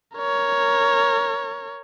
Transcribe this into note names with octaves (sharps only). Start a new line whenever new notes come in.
A#4 C#5